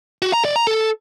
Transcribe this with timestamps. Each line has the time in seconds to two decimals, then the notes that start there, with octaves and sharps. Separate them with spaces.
0.22 F#4
0.33 A#5
0.45 D5
0.56 A#5
0.67 A4